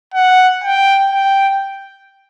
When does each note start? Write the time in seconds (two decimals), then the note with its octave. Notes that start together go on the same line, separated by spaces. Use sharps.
0.14 F#5
0.64 G5
1.13 G5